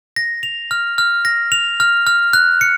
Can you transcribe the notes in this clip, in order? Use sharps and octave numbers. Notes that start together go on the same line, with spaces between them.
A#6
F7
F6
F6
A#6
F7
F6
F6
F#6
C#7